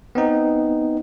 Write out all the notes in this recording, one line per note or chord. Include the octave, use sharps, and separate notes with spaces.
B3 C4 D#4